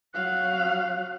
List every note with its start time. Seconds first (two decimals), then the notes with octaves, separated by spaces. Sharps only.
0.14 F#3 F5 F#6